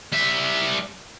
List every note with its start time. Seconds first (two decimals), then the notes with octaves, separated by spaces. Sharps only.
0.12 G3 E5